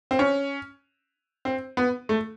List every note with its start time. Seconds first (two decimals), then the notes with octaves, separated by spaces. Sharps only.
0.11 C4
0.19 C#4
1.45 C4
1.77 B3
2.09 A3